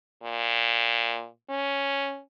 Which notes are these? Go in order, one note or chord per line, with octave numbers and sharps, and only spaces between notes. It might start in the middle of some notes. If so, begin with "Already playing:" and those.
A#2
C#4